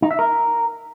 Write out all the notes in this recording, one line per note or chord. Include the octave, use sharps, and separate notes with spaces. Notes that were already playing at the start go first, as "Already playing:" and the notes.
D#4
E5
A#4